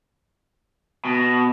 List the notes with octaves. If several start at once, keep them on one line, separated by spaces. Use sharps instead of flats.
B2